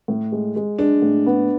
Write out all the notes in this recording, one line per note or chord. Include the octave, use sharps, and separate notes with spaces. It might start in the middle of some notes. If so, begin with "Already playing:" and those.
A2
G#3
G#3
G#3 D4
A2
B3